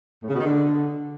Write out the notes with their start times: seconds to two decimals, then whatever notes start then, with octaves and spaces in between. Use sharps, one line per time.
0.23 A2
0.28 C#3
0.34 B2
0.40 D#3
0.46 D3